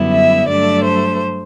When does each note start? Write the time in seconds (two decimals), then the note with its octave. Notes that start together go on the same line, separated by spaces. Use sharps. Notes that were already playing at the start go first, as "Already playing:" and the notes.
Already playing: F#2 D3 G3 B3 E4
0.14 E5
0.49 G2 F#3 A3 D4 D5
0.84 C5